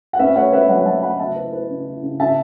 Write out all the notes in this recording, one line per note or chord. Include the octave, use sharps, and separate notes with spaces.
F#5
C#4 B4 E5
A3 C#5 F#5
C#4 B4 E5
F#3 C#5 F#5
F#5
F#3 E5 A5
A3 F#5 B5
C#3 E5 A5
E4 B4
E4 B4
C#3
E4
C#3
C#3 E5 A5